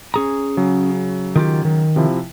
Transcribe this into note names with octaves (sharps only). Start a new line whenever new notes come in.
C#4 G#4 A#5
C#3 F#3
D#3 F4 G4
D#3
C3 F3 E4